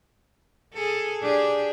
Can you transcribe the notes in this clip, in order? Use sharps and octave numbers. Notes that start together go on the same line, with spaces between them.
G#4 A4
D4 G4 G#4